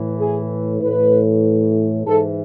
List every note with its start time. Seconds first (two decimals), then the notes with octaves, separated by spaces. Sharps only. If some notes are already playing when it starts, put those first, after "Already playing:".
Already playing: A2 E3
0.18 G#4
0.81 A2 E3 B4
2.06 G#2 E3 A4